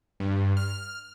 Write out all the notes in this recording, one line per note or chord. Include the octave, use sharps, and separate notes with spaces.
G2
F6